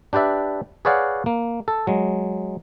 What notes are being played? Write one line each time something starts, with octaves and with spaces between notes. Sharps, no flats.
D4 G4 B4 D5 E5
G#4 B4 C#5 D5 F5 F#5
A#3
A4
F#3 G#3